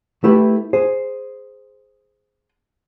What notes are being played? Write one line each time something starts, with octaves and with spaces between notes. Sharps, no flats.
A3 E4 G4 B4
G#4 C5